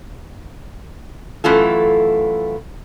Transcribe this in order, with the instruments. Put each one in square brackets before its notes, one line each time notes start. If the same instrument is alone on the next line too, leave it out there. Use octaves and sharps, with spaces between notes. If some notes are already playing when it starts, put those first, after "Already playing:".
[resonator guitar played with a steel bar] F#2 E3 A3 F4 A4